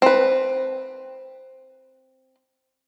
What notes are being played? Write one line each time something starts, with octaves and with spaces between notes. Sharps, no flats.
C4 B4